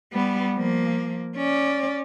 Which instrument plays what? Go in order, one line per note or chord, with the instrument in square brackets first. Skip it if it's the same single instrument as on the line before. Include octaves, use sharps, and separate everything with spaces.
[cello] G3 B3
F3 A#3
C#4 D5